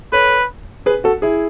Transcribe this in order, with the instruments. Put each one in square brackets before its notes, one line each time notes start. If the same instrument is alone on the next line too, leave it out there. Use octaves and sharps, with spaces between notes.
[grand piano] A4 C#5 [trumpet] B4
[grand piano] G#4 B4
F#4 A4
E4 G#4